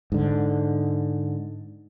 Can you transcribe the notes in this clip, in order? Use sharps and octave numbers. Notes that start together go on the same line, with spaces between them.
G#2 D3